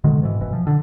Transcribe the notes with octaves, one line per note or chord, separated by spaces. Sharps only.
B2 D3 D#3 G#3
G#2 B2 E3
F#1 B2 E3
F3
D3